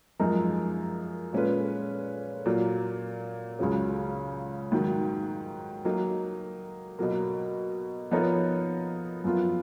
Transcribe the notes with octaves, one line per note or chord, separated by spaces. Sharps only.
F#2 F3 G#3 D#4 A#4
A#2 G#3 C#4 F4 B4
A#2 F#3 A#3
C#2 C#3 F#3 C#4 G#4
G#2 D#3 F#3
F#3 A#3 D#4
B2 F#3 A#3
F3 B3 D#4 A#4 C#5
F#2 F3 B3 F4